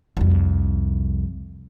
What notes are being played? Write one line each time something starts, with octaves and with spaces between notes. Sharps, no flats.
C2 F2